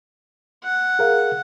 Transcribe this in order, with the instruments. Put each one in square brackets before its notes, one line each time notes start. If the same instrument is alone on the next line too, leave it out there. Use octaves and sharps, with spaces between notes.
[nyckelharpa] F#5
[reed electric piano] G#4 A#4 F5